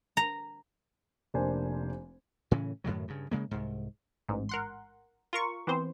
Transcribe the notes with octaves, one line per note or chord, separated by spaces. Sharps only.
A#5
F1 A#3 D4 C5 G#5
A2 C#3 E3 C#4
F#2 A2 D#3 F#3
G2 C#3
C#3 G#3 A#3
C2 G#2
A1 G#2
A#4 F#5 C6
F4 A#4 C#6
E3 B3 C4 C5